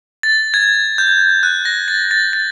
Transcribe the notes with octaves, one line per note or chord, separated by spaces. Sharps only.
A6
G#6
G6
F#6
A#6
A6
A6
A6